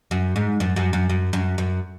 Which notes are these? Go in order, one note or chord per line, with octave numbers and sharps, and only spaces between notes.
F#2
G#2
F#2
F#2
F#2
F#2
F#2
F#2